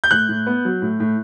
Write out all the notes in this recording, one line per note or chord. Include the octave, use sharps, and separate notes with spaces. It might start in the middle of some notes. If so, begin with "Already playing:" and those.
G6
A2 F#6
A2
B3
F#3
A2
A2